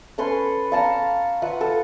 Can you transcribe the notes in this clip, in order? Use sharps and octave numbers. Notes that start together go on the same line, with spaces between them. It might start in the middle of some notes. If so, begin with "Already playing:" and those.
C#4 A4 B4 C6
F5 A5 A#5 C#6
F4 B4 E5 F#5
A4